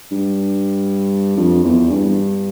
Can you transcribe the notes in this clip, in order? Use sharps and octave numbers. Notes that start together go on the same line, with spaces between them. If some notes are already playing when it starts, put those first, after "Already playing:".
G2
F2
E2
G2